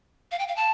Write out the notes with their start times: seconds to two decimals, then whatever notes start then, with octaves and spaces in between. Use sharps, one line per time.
0.31 F5
0.39 G5
0.48 F5
0.56 A5